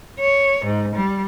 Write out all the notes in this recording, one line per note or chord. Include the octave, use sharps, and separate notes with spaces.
C#5
G#2
G3